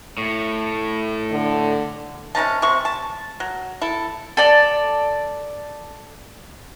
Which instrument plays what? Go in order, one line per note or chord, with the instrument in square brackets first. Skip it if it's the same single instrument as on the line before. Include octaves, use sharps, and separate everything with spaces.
[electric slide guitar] A2
[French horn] D3
[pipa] C3 C#4 D#4 A5
C3 C4 C#6
A5
F#3
E4 A4
[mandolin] A4 D5